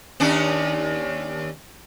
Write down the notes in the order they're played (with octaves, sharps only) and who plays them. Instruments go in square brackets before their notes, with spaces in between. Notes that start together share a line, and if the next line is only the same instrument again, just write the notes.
[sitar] D#2 C#4 D4